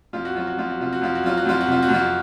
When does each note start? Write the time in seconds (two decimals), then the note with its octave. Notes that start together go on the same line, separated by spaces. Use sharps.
0.13 F2 F4
0.25 F#4
0.35 F#3 F4
0.47 F#4
0.57 F2 F4
0.70 F#4
0.79 C3 F4
0.93 F#4
1.01 F2 F4
1.15 F#4
1.23 F#3 F4
1.37 F#4
1.45 F2 F4
1.61 F#4
1.66 C3
1.72 F4
1.82 F#4
1.89 F2
1.94 F4